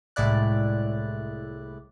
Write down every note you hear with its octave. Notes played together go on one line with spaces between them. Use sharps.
C2 A2 G#3 E4 D5 F#6